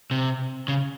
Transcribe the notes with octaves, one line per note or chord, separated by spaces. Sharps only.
C3
C#3